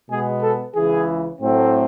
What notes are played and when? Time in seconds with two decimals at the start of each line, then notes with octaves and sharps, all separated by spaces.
0.10 B2 G#3 B3 G#4
0.42 A4
0.75 C#2 C#3 E3 G#4
1.41 A2 F#3 A3 C4